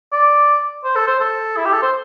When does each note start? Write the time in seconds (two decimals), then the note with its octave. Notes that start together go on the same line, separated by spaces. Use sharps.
0.13 D5
0.84 C5
0.95 A4
1.07 C5
1.20 A4
1.57 E4
1.65 G4
1.73 A4
1.82 C5